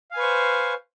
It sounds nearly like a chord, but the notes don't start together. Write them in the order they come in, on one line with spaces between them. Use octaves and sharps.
F5 G#5 B4 C#6 C5